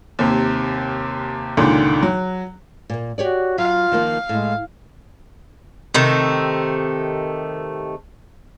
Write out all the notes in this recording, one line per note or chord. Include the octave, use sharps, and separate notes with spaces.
D#2 C3
C#2 A#2 D3 D#3
F#3
A#2 A#3
F#4 G4 C#5 D5
F#3 F4 F5
D#3 F3 A#3
A2 G#3
C3 D#3 A3